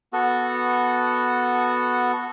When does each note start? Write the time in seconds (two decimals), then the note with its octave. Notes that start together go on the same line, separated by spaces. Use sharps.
0.13 B3 F#4 A4